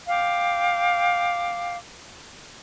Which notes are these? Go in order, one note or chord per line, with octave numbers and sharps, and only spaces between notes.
F5 G5 D6